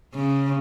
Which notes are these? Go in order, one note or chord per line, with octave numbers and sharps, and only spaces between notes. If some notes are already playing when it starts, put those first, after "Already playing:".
C#3